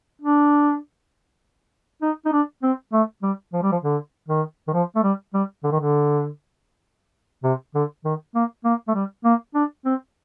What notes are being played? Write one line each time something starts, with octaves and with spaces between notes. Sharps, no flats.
D4
D#4
D#4
D4
C4
A3
G3
F3
G3
F3
D3
D#3
D#3
F3
A3
G3
G3
D3
D#3
D3
C3
D3
D#3
A#3
A#3
A3
G3
A#3
D4
C4